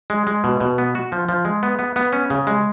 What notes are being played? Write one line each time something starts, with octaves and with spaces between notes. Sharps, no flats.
G#3
G#3
B2
B2
B3
F#4
F3
F3
G#3
B3
B3
B3
C#4
C#3
G#3